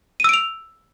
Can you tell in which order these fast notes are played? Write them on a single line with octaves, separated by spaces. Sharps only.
D#7 E6 D7 F7